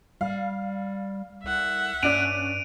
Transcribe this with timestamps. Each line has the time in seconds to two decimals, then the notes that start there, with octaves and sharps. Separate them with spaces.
0.21 G3 F5
1.44 C2 E5 F#5
2.03 G2 C#4 D5 F#6 D7 D#7 F7